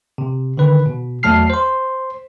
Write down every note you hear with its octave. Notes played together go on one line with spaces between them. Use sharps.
C3
D3 D#3 B4 B5
B2
E2 F#3 A3 A5 F6 C7
C5 C6